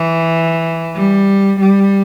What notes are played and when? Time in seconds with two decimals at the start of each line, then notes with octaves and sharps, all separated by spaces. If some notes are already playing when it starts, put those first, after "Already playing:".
Already playing: E3
0.96 G3
1.60 G3